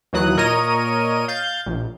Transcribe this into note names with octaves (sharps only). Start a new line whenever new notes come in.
D#2 E3 F#3 D#6 F#6
A#2 A#4 C#5 D#5 D#7
F5 G6 A6
A#1